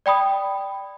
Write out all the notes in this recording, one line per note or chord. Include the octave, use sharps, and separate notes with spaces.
D5 G5 B5 D#6